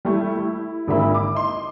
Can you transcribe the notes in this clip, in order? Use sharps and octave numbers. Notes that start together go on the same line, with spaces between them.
G3 A3 E4
E4
G#1 D3 A#3 F4 E5 B5
D6
D#5 C6